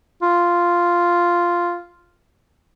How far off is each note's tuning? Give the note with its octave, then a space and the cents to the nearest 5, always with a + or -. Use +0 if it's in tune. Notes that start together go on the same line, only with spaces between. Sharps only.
F4 -5